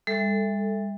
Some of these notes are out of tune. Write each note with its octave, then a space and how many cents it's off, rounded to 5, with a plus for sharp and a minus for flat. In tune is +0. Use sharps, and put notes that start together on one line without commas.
G3 +45 A4 +0 E5 +0